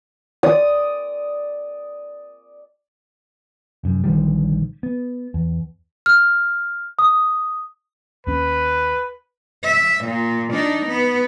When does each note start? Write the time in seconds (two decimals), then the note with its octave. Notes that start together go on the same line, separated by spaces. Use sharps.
0.43 D5 D#6
3.84 F1 F#2
4.04 A#1 D3 D#3 G3
4.83 B3
5.34 E2
6.06 F6
6.99 D#6
8.27 D#2 C#4 B4
9.64 E5
10.05 A#2
10.53 D4 D#4
10.86 B3